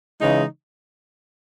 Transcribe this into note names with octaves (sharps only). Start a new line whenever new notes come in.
C#3 E3 G#3 D#4